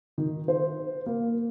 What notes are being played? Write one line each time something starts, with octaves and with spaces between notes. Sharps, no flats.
D#3
C5
A#3